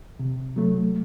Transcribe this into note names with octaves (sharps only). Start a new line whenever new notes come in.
C3
F#3 A3